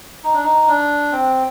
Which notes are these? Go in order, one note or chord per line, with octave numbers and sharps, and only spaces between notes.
D#4
D4
D#4
D4
C4